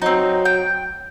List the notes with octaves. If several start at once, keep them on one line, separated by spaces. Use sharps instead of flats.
F#3 C4 D#4
G5